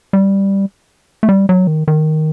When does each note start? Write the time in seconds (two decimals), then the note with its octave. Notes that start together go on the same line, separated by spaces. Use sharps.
0.13 G3
1.23 A3
1.29 G3
1.49 F#3
1.67 D#3
1.88 D#3